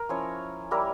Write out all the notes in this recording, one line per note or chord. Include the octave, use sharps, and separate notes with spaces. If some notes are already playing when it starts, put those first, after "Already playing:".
Already playing: A#4
F3 C#4 E4 C#5
G3 A#3 E4 A#4